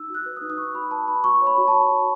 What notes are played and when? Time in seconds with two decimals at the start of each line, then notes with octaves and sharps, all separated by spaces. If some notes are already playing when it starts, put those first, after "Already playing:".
Already playing: D#4 E6
0.10 F#4 F#6
0.26 B4
0.37 D#6
0.41 D#4
0.50 D#6
0.58 D#4 C#6
0.75 F#4 B5
0.91 B4 A5
1.08 D#4 B5
1.24 F#4 C#6
1.41 C#5
1.47 B5
1.58 F#4
1.68 A5
1.74 C#5
1.90 F#4